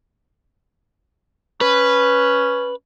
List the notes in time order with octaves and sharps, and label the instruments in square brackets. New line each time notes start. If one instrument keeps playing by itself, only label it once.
[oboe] C#4 [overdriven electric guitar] B4